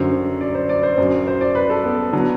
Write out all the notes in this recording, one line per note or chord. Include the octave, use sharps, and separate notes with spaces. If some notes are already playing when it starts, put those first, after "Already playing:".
Already playing: F#2 D3 F#3 C5
D5
C5
D5
C5
F#2 F#3
C5
D5
B4
A4
B3
D3 F#3